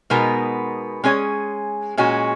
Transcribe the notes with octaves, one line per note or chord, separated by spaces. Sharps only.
B2 G#3 B3 D#4 A#4
G#3 C#4 G#4 C#5
A#2 G#3 C#4 F#4